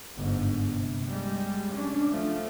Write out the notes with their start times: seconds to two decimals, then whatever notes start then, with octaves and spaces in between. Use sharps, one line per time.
0.17 G1 G#2
0.74 C3
1.08 G3 G#3
1.73 C#4 D4
2.10 F3 A3